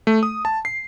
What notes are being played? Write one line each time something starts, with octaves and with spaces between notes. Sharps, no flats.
A3
D#6
A5
C7